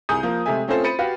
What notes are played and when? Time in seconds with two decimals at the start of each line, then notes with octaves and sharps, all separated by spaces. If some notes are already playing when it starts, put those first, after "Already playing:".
0.09 C2 G#4 D#6 G6
0.23 F3 A#3
0.46 C3 G#3 A3 E5 G#5
0.68 A3 C4 C#4 F4 A4 C5
0.84 C5 B5 A6 C#7 D#7
0.99 F#4 G4 B4 F5